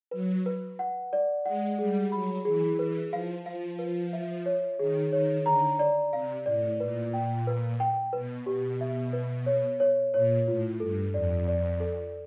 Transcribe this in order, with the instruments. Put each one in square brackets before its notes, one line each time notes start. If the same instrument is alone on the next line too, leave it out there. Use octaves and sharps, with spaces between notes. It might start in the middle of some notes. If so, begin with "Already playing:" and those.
[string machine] F#3 [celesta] B4
[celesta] B4
F#5
D5
[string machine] G#3 [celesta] F#5
[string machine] G3 [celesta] G#4
[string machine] F#3 [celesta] B5
[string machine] E3 [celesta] G#4
[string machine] E3 [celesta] B4
[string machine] F3 [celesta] F5
[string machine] F3 [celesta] F5
[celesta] B4
E5
C#5
[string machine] D#3 [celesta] G#4
[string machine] D#3 [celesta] C#5
[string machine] D3 [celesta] A#5
[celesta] D5
[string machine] C3 [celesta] F5
[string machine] A2 [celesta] D5
[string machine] A#2 [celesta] B4
[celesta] G5
B4
G5
[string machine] B2 [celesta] B4
[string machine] B2 [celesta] G4
[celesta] E5
B4
C#5
C#5
[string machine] A#2 [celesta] C#5
[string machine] A2 [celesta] F4
[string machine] G2 [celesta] A4
[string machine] F2 [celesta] D5
[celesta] D5
A4